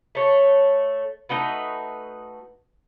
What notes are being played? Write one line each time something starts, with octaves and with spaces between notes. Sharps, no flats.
A3 C#5
A3 D#4 F#4 B4